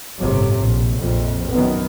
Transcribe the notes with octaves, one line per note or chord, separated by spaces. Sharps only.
G1 A2 C3
A#1
A#1 F2
F#2 D#3 B3